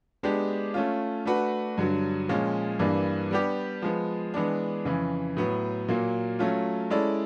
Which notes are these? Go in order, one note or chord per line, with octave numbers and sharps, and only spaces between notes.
G#3 B3 D4 G4
A3 C#4 F4
A3 D4 F#4 B4
G2 D3 F#3
A#2 F3 G#3 C#4 F4
G2 E3 G3 A#3 D4
G3 B3 D4 G4
F3 G#3 B3
E3 G#3 B3 D4
F2 C#3 E3
A2 F#3 B3
A#2 F#3 A#3
F#3 A3 C#4 F4
G#3 C#4 E4 A4 D5